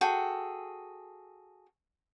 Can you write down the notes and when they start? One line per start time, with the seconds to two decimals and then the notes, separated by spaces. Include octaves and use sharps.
0.01 F#4 G#4 A4 G5